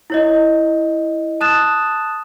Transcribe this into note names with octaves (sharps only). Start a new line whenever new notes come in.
E4 C#5 D#5
A5 D#6 F#6 A6 E7